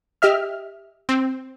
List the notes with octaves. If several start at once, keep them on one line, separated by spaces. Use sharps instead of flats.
G4 D#5 E5 F6
C4